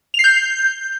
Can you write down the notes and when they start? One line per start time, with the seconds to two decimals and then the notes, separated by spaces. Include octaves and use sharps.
0.14 F7
0.19 C7
0.24 G6